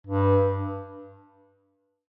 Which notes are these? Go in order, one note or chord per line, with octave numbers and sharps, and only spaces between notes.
G2